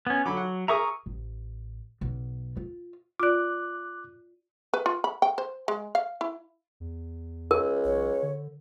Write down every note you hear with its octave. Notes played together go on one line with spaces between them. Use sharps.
B3 C#4
D3 F#3 B5 D6
F#5
G#4 A#4 E5 A#5 C#6 D#6
A1
B1
F4
F4 D5 D6 F#6
B4
F4
B5
G5
C5
G#3
F5
E4
E2
C#2 A#4
B1 C#5
D3